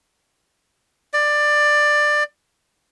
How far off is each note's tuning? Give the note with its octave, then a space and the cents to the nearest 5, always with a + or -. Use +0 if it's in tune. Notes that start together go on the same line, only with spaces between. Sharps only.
D5 +15